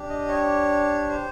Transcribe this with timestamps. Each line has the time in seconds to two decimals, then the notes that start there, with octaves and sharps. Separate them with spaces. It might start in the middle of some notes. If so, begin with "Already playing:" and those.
Already playing: D4 G4
0.09 D#5
0.28 C#5
1.09 C5